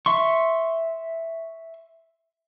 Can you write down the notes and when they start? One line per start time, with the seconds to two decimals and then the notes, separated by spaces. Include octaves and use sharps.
0.06 E5 C6 C#6